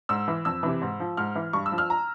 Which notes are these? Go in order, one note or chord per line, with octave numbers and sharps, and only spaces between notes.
G#2 E6
E3
F2 E6
C3 E3
G#2
F3
G#2 F6
E3
G2 C#6
E6
F3
F6
A#5